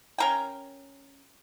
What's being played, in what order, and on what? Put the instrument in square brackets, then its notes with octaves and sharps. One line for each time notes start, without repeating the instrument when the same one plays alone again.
[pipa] C#4 A#4 G5